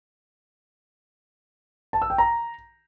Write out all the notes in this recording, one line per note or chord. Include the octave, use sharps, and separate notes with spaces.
A5
E6
G5
A#5